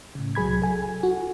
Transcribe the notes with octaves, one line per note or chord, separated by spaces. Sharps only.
A2 C#3
C2 F#3 G#4 B5 G#6
A4 G#5
F#4